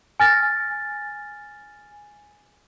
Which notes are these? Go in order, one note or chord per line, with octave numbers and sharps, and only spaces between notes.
G#5 F6 A6 A#6